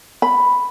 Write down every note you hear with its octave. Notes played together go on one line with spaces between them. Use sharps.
B5